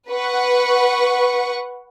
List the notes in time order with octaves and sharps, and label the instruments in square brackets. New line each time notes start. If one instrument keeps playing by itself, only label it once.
[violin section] B4 F#5 C#6